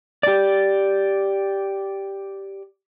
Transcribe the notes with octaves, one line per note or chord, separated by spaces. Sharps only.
G4 D5